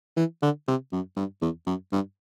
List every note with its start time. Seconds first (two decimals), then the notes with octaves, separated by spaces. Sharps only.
0.16 E3
0.42 D3
0.67 C3
0.92 F#2
1.16 G2
1.41 E2
1.66 F#2
1.92 G2